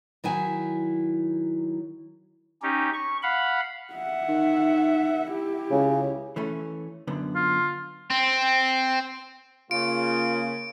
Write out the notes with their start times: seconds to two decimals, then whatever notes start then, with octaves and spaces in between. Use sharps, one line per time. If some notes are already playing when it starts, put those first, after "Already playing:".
0.24 D#3 F#3 E4 G#5
2.62 C#4 D#4 G4
2.94 C#6
3.23 F5 F#5 B5
3.93 E5 F#5
4.28 D#3
5.31 E4 G4
5.71 C#2 C#3
6.36 E3 A3 C#4
7.08 F#2 D3 B3
7.36 F4
8.10 C4
9.71 C#3 A#3 F4 D7